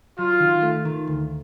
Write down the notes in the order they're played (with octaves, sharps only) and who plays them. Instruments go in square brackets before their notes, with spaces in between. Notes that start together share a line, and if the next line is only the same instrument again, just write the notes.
[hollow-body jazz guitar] F#3 [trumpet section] F4
[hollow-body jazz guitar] D#3
A3
D#3
D2